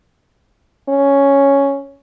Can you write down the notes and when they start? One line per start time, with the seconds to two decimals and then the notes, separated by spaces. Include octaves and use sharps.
0.89 C#4